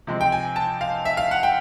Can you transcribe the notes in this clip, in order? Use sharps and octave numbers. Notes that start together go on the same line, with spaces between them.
C3 F3 G#3 C4
G5
G#5
A5
F5
E5
F5
F#5
G5